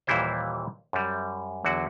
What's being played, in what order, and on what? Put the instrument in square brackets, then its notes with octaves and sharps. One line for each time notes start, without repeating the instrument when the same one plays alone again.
[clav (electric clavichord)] D#2 A#2 E3 G3 E4 C5
F#2 G3
E2 D3 F#3 F#4